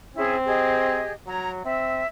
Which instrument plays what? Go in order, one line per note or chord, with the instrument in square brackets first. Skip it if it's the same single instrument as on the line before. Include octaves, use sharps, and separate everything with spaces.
[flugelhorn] C4 [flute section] C#4 E4 G#4
[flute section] G4 G#4 D#5
[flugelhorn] F#3 [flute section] C#5 A#5
[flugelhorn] C4 [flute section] E5